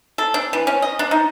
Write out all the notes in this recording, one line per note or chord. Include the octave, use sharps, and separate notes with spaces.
A4
D4
E3
C#4
D#5
D4
D#4